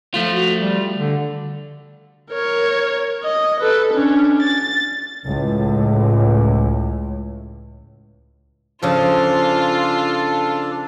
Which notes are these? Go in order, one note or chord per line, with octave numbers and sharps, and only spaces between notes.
F3 A3 F4
F#4
G3
D3
A#4 C#5
D#5
A4 B4
C#4 D4
A6
C#2 A2
C#3 F3 D4 F4 A4